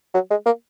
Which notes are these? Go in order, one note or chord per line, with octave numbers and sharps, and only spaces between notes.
F#3
G#3
A#3